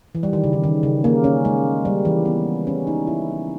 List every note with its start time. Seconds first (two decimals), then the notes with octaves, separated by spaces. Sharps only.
0.15 E3
0.23 G3
0.33 D#3
0.44 C#3
0.53 D#3
0.64 D#3
0.83 C#3
1.04 A#3
1.24 C#4
1.45 G#3
1.85 G3
2.05 E3
2.25 B3
2.67 C#4
2.87 D#4
3.07 E4